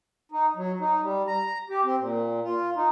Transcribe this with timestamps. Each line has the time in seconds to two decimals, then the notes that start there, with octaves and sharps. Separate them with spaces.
0.32 D#4
0.56 F#3
0.80 D#4
1.02 G3
1.28 A#5
1.70 G4
1.84 C4
1.99 A#2
2.44 F4
2.76 D#4